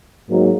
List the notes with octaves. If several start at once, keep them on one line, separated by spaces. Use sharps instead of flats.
G#2 F#3 A#3